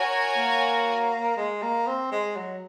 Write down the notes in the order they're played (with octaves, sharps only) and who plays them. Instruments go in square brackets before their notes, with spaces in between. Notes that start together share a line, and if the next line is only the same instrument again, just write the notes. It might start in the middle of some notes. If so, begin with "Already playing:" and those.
Already playing: [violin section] F#4 A#4 C#5 G#5
[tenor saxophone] A#3
G#3
A#3
C4
G#3
F#3